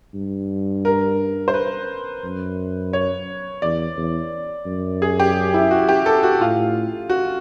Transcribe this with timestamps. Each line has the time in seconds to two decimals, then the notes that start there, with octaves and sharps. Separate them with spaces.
0.14 G2
0.85 A#4
1.48 C5
1.54 B4
2.24 F#2
2.93 C#5
3.62 E2 D5
3.97 E2
4.66 F#2
5.02 G#4
5.20 G4
5.54 E4
5.71 F#4
5.89 G4
6.06 A4
6.23 F#4
6.41 A2 F4
7.10 F#4